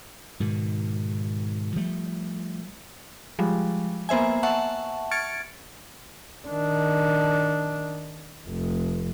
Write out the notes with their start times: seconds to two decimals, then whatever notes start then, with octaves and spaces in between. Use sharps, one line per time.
0.40 G#2 B2 D#3
1.76 F3 G3 A3
3.39 F3 G3 G#3
4.09 A#3 B3 C5 E5 G#5
4.43 E5 F#5 A5 C#6
5.11 C#6 F6 G#6 A6 C#7 D7
6.48 D#3 D4
8.48 F1